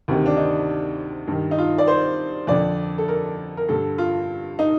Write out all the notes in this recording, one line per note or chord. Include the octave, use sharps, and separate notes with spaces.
D2 C3 D#3
D4
D#4
G2 D#3
D#4
F4
D5
C5
F2 D3 D5
A4
A#4
A#4
G2 D3 A4
F4
D#4